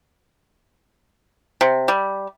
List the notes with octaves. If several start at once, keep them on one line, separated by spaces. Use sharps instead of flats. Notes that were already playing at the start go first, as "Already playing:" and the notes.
C3
G3